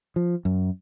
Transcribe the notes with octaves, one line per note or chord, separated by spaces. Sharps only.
F3
F#2